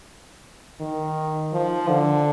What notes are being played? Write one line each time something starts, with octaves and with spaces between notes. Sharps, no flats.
D#3
F3
D3